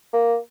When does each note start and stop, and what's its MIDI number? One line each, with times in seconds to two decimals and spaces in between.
0.13 0.36 58